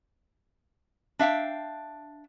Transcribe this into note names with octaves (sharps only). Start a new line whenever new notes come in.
D4 E5 F5 G5